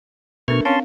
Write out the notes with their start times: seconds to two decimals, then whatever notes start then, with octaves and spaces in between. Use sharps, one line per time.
0.48 B2 A3 D4 A#4 B4 C#6 F6
0.65 C4 C#4 F5 A5 C6